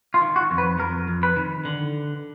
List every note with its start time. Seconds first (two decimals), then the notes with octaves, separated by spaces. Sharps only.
0.14 F4
0.21 D#3
0.36 F#4
0.51 F2
0.58 B4
0.79 F2 A#4
1.08 F2
1.23 B4
1.36 D#3
1.65 D3